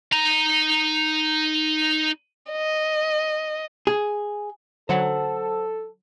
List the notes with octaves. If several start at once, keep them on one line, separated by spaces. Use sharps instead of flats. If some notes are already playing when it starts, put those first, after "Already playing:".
D#4 A#5
D#5
G#4
D3 F#3 A4 C5 F#5